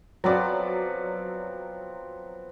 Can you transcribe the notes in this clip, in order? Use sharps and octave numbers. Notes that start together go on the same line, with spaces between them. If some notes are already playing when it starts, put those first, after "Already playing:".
F3 F#3 B3 C4 D5